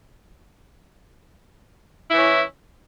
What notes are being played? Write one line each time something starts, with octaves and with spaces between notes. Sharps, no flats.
E3 C#4 E4